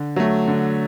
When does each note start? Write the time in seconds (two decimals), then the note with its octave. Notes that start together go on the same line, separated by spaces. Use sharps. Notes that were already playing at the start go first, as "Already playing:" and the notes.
Already playing: D3
0.16 F#3 A3
0.48 D3